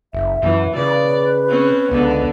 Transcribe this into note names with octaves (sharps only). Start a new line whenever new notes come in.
F#1 E5
F#2 E3
C#3 B4 D5
C4 C#4
C#2 D3 B3